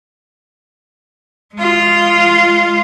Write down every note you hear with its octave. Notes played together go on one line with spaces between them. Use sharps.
G#3 F4